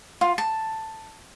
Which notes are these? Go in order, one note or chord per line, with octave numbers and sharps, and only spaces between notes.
F4
A5